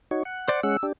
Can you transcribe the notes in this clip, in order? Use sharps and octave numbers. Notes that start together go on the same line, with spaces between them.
D#4 F#4 C#5
F#5
C5 D5
G#3 C#4 F#5 E6
D4 G4